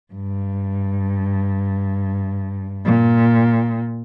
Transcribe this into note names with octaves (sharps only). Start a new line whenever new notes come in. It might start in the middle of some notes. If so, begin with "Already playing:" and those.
G2
A#2